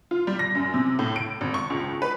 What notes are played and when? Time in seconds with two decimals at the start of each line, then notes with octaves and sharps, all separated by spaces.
0.11 F4
0.27 G3
0.39 A#6
0.55 F#2
0.74 C3
0.99 A2
1.16 D7
1.41 G#1
1.54 C#6
1.70 C#2
2.02 B4